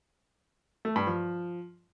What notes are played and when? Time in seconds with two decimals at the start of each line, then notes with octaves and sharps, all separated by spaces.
0.85 A3
0.96 G2
1.07 F3